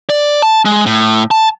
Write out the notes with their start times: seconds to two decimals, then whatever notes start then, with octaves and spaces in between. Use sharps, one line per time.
0.10 D5
0.42 A5
0.65 G#3
0.86 A2
1.31 A5